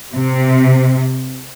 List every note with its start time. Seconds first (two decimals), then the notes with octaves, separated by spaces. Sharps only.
0.15 C3